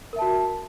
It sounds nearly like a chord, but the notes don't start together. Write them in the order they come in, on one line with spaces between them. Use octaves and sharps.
A#4 E5 A5 F#4